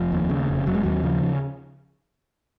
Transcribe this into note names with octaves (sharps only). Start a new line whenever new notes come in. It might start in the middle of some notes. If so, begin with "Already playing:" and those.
Already playing: F1 F3
D#2
C#3
F1
F1 F#3
G#3
D#2 F#3
C#3 F3